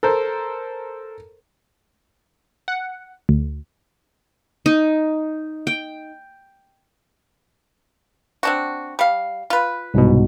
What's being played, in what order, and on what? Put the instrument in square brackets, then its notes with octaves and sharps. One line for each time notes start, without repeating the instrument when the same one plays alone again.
[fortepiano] A4 A#4 C5
[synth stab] F#5
D2
[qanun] D#4
G5
[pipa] C4 D4 F#4
G3 F5
F4 B4
[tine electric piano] C2 G#2 B2